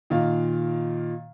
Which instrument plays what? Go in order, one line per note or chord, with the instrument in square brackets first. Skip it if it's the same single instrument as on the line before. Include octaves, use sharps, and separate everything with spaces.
[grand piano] A#2 D#3 F5